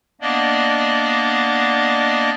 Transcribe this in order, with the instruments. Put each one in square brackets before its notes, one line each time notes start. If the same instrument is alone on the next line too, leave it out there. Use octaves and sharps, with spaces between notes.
[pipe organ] A#3 B3 D4 D5 D#5